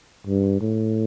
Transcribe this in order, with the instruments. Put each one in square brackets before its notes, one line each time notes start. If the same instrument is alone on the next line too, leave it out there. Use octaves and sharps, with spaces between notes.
[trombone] G2
A2